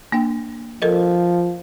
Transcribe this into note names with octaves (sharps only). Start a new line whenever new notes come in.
A#3 D4 G5
F3 A4 A#4 D#5